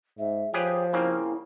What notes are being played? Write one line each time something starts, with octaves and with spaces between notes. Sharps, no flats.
G#2 E5
F3 G4 G#4 B4 C#5
C#3 A#3 C4 E4